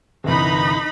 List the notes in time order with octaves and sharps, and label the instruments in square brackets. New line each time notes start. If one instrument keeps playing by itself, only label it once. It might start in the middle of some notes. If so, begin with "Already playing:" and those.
[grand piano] G1 C2 E3 [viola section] D#4 B5